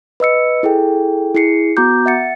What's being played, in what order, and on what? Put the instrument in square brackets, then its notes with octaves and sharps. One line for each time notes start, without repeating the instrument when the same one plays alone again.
[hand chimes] B4 D#5 E6 C#7
E4 G#4 A4 G5
E4 G#4 C7 C#7
B3 F#4 A#5 D6 G6
E5 F#5 A6 C#7